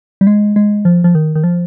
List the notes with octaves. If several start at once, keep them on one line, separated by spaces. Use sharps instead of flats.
G3
G#3
G#3
F3
F3
D#3
D#3
F3